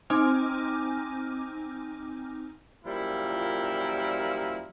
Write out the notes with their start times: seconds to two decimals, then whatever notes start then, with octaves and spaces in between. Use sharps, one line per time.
0.10 C4 D#4 G#5 D6 F6
2.85 F#2 A#2 F3 G3 E4 A#4